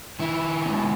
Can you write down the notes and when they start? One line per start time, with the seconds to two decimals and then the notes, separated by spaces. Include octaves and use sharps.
0.19 D#3 E4
0.64 G#3 B3 D#4